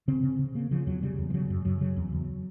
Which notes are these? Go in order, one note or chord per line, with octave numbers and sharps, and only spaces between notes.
C#3 C4
C#3
C#3
C#3 A#3
C#3 F3
E2 F#3
C#3 G3
E2
F3
C#3 F#3
F#2
F#2 F#3
C#3 F#3
E2
E2